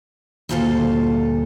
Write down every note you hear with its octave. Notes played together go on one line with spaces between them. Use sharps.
D2 G2 A#2 F4 A4 C5